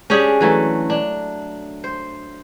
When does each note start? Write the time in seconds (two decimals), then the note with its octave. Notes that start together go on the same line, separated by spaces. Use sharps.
0.10 C#4 D4 G4 G#4
0.40 E3 F#3 A3
0.90 D4
1.84 C5